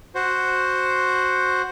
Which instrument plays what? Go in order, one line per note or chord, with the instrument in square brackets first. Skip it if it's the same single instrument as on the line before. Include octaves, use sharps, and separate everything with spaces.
[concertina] F#4 C5